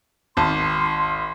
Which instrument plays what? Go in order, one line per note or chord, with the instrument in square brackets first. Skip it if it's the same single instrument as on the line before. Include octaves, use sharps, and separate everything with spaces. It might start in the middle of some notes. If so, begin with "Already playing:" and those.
[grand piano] G#1 A5 [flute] C6